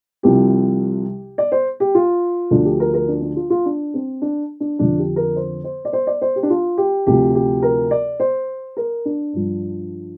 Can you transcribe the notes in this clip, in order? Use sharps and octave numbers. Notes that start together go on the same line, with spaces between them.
C2 C3 F3 G4
D5
C5
G4
F4
D2 D3 F3 D4
G4
A#4
A#4
D4
D4
F4
F4
D4
C4
D4
D4
F2 D3 F3 D4
G4
A#4
C5
C5
D5
C5
D5
C5
G4
D4
F4
G4
D2 C3 F3 G4
G4
A#4
D5
C5
A#4
D4
G2 F3